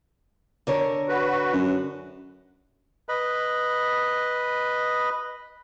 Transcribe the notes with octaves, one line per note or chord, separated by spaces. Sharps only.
D3 A#4 C#5
F#4 B4
F#2
B4 D#5 B5